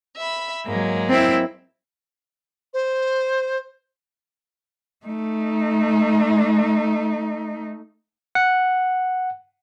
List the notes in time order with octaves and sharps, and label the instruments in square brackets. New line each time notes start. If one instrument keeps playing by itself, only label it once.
[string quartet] E5 B5
[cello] G#2 [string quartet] F#3 G#3 A#3
[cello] C4 E4
[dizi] C5
[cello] A3 D#4
[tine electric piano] F#5